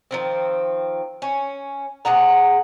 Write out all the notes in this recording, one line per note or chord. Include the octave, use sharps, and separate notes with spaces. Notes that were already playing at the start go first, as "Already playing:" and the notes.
D#3 F3 C4
C#4
C3 G#4 F#5 A#5